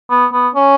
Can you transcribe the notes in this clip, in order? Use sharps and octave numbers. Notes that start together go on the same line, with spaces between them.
B3
B3
C#4